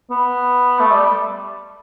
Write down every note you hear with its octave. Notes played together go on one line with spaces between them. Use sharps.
B3
A3
G3